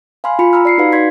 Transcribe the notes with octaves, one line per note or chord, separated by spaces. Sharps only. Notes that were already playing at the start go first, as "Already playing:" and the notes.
F5 G#5 B5 C6 F6
F4 B5 C#7
A#5 B5 E6 F6
D5 C7 C#7
D#4 F#4 B4 F5
D#4 D5 F5 C6 G#6 B6